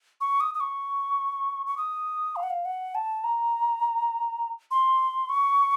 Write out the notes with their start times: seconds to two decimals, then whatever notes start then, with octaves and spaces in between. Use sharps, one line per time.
0.21 C#6
0.40 D#6
0.54 D#6
0.60 C#6
1.66 C#6
1.77 D#6
2.36 F5
2.43 F#5
2.50 F5
2.65 F#5
2.95 A5
3.24 A#5
4.71 C6
5.29 C#6